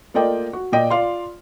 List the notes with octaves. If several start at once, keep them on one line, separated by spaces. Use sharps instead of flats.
A3 A#3 F4 D5 D#5 G5
F#4
A#2 D5 D#5 G5
F4 D5 F5 C6